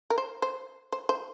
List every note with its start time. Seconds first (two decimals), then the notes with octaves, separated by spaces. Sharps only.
0.10 A#4
0.18 C5
0.42 C5
0.92 C5
1.09 C5